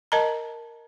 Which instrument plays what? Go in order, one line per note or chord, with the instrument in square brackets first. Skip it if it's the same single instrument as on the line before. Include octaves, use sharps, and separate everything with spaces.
[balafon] A#4 D#5 A5 A#5